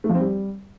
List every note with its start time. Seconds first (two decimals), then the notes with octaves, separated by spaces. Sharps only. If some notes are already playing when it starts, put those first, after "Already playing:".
0.04 A3
0.09 F3
0.15 C4
0.20 G3